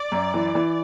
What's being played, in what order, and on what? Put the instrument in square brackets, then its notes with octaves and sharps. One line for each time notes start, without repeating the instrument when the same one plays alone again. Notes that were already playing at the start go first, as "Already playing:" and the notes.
Already playing: [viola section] D5
[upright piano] F#2
E3
E3